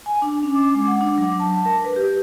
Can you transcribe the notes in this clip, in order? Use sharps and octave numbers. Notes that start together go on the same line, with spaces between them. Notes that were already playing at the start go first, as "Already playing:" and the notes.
G#5
D4
C#4
D6
G#3
F#5
D4
F#3
A5
A#4
B4
G4